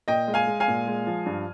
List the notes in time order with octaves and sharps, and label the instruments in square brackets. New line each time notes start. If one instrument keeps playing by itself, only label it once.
[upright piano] A#2 D#5 G5
G#3
F5 G#5
G#3
F5 G#5
A#2
G#3
F3
G2